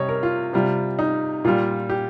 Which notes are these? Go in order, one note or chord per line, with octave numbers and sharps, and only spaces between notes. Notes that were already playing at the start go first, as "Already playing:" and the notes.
Already playing: C3 G3 C#5 D#5
A#4
F4
C3 G3 F4
D#4
A#2 G3 F4
G4